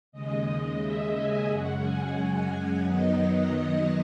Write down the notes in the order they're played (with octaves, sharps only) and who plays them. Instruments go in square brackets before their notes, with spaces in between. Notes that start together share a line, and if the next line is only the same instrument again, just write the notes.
[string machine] D#2 C#3 G#3 D#5
E5
G#5
F#2 C#3 G#3 C#4 F#5
G#5
F#5
F#2 D#3 F#3 B3 D#4 D#5
D#5